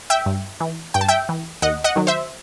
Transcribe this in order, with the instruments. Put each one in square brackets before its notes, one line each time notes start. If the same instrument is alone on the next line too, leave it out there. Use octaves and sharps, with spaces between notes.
[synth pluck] E5 G5
G2
E3
G2 G5
A5
E5 G5
E3
D#2 D#5 F#5
D#5 F#5
D#3 F#3
C5 E5